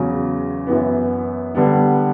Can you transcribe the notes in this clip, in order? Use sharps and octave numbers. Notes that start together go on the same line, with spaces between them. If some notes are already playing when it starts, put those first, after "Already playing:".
Already playing: E2 C#3 F#3
F#2 E3 B3
D3 G3 B3